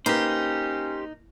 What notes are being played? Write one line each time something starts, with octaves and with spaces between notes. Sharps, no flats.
A#3 C#4 D#4 G4 B4 C5